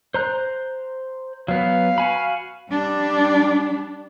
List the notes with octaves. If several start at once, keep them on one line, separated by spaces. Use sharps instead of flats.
C5 A#5 F#6
F#3 B3 F5
F#4 G#5 B5
G3 D4